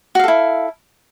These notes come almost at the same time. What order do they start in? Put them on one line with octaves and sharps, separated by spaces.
F#4 F5 A4 E4